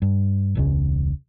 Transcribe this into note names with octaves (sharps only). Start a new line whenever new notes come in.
G2
E1 C#2 C#3